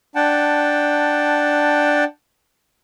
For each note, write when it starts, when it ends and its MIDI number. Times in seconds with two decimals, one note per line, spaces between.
0.15 2.04 62
0.15 2.04 78
0.15 2.04 79
0.15 2.04 81